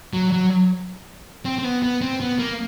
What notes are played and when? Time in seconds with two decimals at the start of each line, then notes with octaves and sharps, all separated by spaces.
0.13 F#3
0.33 F#3
1.45 C4
1.59 C4
1.64 B3
1.83 B3
2.02 C4
2.21 B3
2.39 A#3